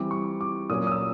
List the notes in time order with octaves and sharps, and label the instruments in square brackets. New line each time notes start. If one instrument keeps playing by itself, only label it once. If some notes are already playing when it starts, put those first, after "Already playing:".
Already playing: [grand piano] E3 G3 C4 D6
C#6
D6
A#2 F#3 A#3 C#4 D#6
D#6
E6